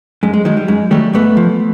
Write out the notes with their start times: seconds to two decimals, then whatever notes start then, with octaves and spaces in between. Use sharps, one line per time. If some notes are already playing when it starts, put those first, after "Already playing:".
0.23 F#2 G#3
0.34 G#3
0.45 D#3 F#3 G#3
0.57 G3
0.68 F#2 G#3
0.91 D#3 F#3 G3 A3
1.13 G#2 A3 B3
1.37 F3